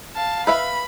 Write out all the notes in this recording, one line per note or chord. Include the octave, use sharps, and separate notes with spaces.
F5 A5
B4 E5 F5 B5